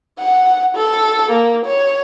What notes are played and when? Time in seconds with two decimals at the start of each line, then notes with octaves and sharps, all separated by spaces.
0.19 F#5
0.75 A4
1.31 A#3
1.66 C#5